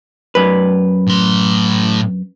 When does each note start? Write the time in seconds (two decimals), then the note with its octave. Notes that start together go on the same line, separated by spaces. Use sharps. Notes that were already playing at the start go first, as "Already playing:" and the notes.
0.35 F#2 B4
1.07 A2 C6